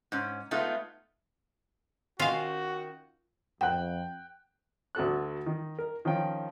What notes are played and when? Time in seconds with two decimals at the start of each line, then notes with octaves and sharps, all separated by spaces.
0.12 G#2 C#4
0.51 G#3 A3 B3 D#4 F4
2.20 D#3 C#4 F4 F#4 F5
3.61 F2 F#5 G5 F#6
4.95 D2 F#4 A4 F#6
5.46 D#3
5.79 A#4
6.05 D#3 F3 C#4 G5